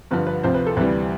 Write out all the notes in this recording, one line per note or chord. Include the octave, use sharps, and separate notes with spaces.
G2 D3 F3 B4
B4
D2 C3 F3 C5
B4
A4
D2 C3 E3 G3 B4